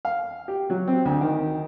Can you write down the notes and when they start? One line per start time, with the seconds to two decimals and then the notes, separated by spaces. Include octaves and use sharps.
0.05 F5
0.48 G4
0.70 F#3
0.88 C4
1.05 D2
1.21 D#3